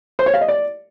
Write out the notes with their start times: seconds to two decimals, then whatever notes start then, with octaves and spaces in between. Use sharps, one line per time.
0.19 C5
0.26 C#5
0.34 F5
0.41 D#5
0.48 D5